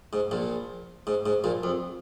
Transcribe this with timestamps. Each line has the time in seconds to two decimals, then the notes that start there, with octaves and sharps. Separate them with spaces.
0.13 G#2
0.31 A#1 A#2
1.07 G#2
1.26 G#2
1.44 A#1 A#2
1.63 F2